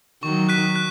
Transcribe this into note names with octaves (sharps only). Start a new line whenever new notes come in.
D#3 F#3 C#6
F#6 B6 D#7
F#6